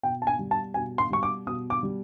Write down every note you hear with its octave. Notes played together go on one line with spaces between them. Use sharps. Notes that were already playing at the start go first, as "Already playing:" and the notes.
B2 G5
A5
G#5
G3
A5
B2 G#5
C6
G3 C#6
D6
B2 D#6
D6
G3